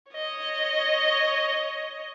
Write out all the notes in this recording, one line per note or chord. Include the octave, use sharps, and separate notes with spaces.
C#5 D#5